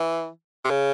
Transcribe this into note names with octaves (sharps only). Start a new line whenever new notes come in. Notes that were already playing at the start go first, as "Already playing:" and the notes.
Already playing: E3
C3
C#3